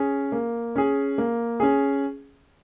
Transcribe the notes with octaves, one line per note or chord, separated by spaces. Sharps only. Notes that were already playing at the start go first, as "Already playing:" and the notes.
Already playing: C#4 G#4
A#3
C#4 G#4
A#3
C#4 G#4